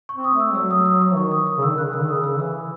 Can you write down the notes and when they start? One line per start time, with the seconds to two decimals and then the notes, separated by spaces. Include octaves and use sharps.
0.09 C#6
0.14 C4
0.24 D#6
0.34 A3
0.40 E6
0.55 F#3 E6
0.71 D#6
0.86 D#6
1.01 C#6
1.16 D#3 C#6
1.32 D#6
1.47 D#6
1.58 C#3
1.62 D#3 E6
1.76 C#3 F#6
1.84 D#3
1.93 C#3 E6
2.02 D#3
2.09 C#3 D#6
2.24 E6
2.39 E3 E6